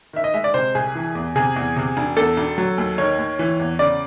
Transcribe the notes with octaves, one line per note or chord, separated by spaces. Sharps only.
D#3 E5
D#5
G#3 E5
D5
C3 C5
C2 G#4
E3
E2
C3 G#4
E2
C3
E1
E2 A4
E1
F#3
D#2
D#3 C#5
D#2
E3
E2
C#3 D5